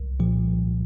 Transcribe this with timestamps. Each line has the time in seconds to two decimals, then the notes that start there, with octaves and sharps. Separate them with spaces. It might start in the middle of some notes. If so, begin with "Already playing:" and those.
Already playing: C2
0.20 A#2 F3